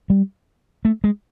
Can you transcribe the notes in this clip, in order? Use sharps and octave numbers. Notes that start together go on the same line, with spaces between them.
G3
A3
G#3